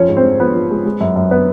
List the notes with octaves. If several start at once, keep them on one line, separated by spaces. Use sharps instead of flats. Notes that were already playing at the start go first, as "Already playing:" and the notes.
Already playing: F2 F3 C#4 C#5
G#2
C4 C5
G#2
F3 B3 B4
F3
G#3
G#3
F#2
F#2
B3 B4